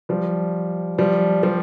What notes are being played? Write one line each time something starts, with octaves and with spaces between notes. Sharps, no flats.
F3 G3
F3 G3
F3 G3